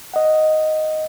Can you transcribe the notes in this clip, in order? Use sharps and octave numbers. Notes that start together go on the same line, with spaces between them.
D#5 F#5